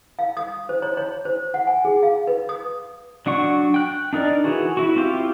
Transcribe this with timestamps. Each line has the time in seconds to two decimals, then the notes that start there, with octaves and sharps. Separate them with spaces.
0.19 F5
0.37 D#6
0.69 C5
0.82 C#5
0.97 C#5
1.25 C5
1.54 F#5
1.67 G#5
1.85 G#4
2.03 F5
2.27 B4
2.49 D#6
3.26 F#3 D4 F#5 C#6
3.74 G5 F#6
4.13 D4 D#4 A#4 D5
4.44 E3 F#4 G#4
4.77 E4 F#4
4.96 C4 E4 F4 G4